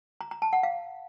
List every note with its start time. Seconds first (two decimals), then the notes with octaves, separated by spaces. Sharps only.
0.21 A#5
0.31 A#5
0.42 A5
0.53 F#5
0.63 F5